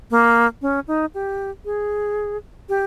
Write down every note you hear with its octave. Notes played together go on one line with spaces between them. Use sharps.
A#3
C#4
D#4
G4
G#4
G4